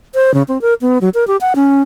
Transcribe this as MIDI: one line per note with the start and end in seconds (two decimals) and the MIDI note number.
0.15 0.34 72
0.34 0.43 49
0.48 0.60 60
0.62 0.74 70
0.82 0.98 59
1.01 1.09 54
1.14 1.27 70
1.27 1.37 67
1.41 1.53 78
1.56 1.82 61